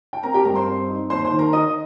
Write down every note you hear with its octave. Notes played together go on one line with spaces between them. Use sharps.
G5
C4 A#4 A#5
G4 G5
G2 A#4 A#5
C5 C6
C4
D#4
D#2 C5 C6
C5 C6
D#3
A#4 A#5
D#4 D#5 D#6